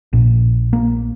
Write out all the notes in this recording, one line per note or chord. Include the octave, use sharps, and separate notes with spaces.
A#1 A#2
A#3